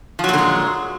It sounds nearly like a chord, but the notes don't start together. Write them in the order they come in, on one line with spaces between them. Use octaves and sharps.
F3 F#3 A#2 D3 G#3